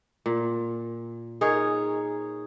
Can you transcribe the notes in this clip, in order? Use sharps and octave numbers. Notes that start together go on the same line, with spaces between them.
A#2
D#4 G#4 A#4 C#5